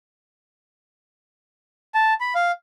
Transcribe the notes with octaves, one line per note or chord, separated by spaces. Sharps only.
A5
B5
F5